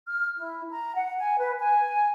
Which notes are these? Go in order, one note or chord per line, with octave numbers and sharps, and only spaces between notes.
F6
E4
A#5
F#5
G#5
B4
G#5